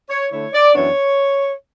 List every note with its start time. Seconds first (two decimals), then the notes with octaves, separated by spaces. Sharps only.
0.09 C#5
0.31 D3 A3 E4 C#5
0.53 D5
0.74 F#2 E3 B3 D4 C#5